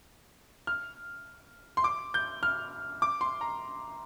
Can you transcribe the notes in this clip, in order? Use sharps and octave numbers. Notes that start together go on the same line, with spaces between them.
F6
C6
D6
G6
F6
D6
C6
A#5